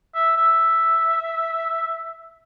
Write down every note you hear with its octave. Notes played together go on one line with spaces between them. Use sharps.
E5
E5